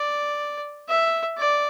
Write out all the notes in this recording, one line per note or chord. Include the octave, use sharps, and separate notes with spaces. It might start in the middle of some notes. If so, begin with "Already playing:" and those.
Already playing: D5
E5
D5